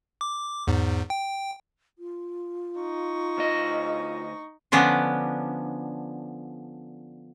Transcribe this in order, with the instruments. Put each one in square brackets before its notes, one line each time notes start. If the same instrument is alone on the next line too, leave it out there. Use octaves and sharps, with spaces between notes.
[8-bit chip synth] D6
E2 G#2
G5
[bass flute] F4
[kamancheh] D#4 C#6
[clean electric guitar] D2 D#5
[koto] D3 F3 B3 C#4 D4